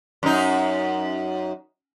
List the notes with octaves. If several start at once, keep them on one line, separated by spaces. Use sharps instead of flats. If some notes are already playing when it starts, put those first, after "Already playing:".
F#2 D#4